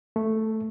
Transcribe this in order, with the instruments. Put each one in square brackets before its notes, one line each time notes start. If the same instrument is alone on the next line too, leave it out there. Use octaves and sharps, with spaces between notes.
[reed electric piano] A3